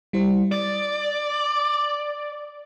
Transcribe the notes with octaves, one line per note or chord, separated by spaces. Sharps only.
G3 E4 C5
D5 D6 D#6 A6